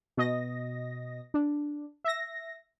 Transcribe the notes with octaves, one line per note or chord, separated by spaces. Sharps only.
B2 D#5 A#6
D4
E5 A#6